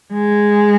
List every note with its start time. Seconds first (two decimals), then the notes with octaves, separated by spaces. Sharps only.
0.13 G#3